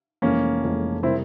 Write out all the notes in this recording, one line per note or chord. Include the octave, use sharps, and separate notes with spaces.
F1 F2 E3 G#3 A#3 C#4
F1 F2 E3 G#3
C3 G3 A#3 C4 E4